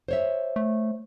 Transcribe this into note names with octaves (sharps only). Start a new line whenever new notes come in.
C5 C#5 E5
A3